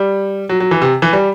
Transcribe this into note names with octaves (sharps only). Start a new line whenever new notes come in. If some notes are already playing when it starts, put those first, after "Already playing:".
Already playing: G3
F#3
F#3
E3
C3
E3
G3